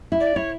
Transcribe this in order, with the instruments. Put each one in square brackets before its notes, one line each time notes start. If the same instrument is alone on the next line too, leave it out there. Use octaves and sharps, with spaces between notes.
[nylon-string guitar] E4
[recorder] D5
[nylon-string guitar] E4 [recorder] C#5